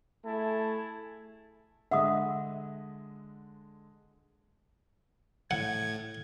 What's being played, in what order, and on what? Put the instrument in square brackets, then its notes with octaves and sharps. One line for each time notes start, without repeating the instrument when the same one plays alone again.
[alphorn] A3 [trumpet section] E4 G#4 A5
[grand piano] D3 G#3 D#5 [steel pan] E5 [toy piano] F#5 D#6
[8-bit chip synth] A2 [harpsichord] F#5 [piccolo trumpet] G#6